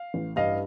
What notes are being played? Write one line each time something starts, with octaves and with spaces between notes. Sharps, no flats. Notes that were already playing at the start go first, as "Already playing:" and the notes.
Already playing: F5
A1
G2 D#5 F5